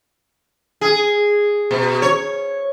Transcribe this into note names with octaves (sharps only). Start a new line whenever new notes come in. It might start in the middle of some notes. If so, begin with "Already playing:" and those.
G#4
B2
C#5